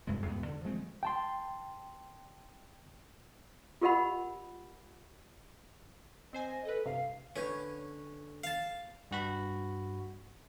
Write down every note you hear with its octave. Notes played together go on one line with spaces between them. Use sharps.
F1 G2 C3 G#3
E2 G#2 B2 B3
D3
F3 G#3 A3 C4
G5 A5 C6
F4 G4 A#4 D#5 F#5 B5
C4 C5 D#5 G#5
A4 B4 D#5
G2 C3 F5
D3 C#4 B4 C#5
F5 A5
G2 F#4 B5